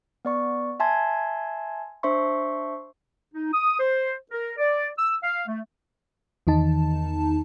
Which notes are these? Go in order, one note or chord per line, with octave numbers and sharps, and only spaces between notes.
B3 D5 C#6
E5 G#5 A5 C6 G#6
D4 C5 E5 C6 C#6
D#4
D#6
C5
A#4
D5
E6
F5
A3
E2 D#3 D#4 A5